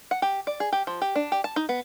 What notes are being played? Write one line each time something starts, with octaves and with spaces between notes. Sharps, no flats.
F#5
G4
D5
G#4
G4
F3
G4
D4
G4
A5
D#4
B3